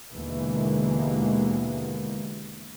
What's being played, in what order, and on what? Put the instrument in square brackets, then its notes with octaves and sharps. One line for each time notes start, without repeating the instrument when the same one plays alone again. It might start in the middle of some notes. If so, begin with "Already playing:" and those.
[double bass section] D#2 B2 D3 E3 G#3 A#3